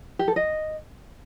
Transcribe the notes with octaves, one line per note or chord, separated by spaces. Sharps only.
G4
A4
D#5